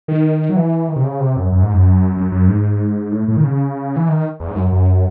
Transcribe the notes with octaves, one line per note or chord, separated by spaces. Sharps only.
D#3
F#3
E3
D#3
C3
C#3
C3
F#2
F#2
G#2
F#2
F#2
F#2
G#2
A2
A2
D#3
C#3
E3
D#3
E2
G#2
F#2
F#2